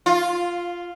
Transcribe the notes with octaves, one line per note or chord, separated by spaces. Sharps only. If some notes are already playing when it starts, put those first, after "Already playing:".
F4